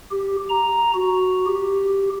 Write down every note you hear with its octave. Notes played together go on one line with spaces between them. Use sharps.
G4
A#5
F#4
G4